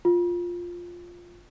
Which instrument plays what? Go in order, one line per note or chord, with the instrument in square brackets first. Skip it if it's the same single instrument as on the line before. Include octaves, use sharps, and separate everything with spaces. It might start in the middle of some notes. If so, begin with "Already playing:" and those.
[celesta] F4